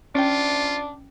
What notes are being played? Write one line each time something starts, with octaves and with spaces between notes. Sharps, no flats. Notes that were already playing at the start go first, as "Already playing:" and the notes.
C#4 D4 F4 G5